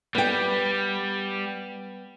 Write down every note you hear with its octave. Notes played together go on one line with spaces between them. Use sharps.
G3 B3 G5